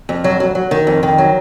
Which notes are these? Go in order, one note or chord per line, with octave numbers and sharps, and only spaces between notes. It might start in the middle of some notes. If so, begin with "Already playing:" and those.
F2
F#3
F#3
F#3
D#3
F2
D#3
F#3